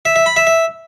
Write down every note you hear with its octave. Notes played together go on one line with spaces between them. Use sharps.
E5
E5
B5
E5
E5